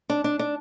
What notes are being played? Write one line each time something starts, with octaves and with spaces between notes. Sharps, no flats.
D4
D4
D4